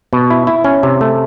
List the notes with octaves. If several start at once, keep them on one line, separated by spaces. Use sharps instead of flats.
B2
E4
E4
C#4
C3
A3